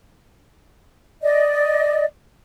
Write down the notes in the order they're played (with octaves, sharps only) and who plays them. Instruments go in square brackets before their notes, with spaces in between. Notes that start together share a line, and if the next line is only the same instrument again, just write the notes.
[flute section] D5 D#5